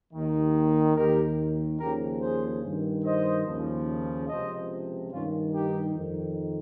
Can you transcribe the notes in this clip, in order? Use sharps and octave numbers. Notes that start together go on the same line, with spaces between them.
D#2 D#3
D#2 D#3 G4 A#4
D#2 C#3 F3 G4 A#4
G#4 C5
G2 D#3
C5 D#5
D#2 C#3 F3
C#2 C3 F3 C5 D#5
G2 D#3 C#4 F4
D#4 G4
F2 D#3